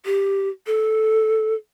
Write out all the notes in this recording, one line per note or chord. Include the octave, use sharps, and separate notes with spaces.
G4
A4